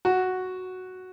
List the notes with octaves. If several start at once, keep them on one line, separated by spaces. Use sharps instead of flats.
F#4